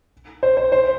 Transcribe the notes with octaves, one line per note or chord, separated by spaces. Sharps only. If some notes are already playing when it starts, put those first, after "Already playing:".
C5
C5
C5